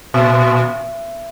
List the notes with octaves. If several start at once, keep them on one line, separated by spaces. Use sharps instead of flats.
A#2